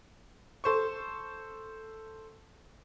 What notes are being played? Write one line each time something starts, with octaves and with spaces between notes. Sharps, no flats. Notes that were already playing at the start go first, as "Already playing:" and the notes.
A4 C5 C#6